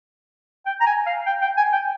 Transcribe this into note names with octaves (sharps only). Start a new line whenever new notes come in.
G5
A#5
G#5
F5
G5
G5
G#5
G5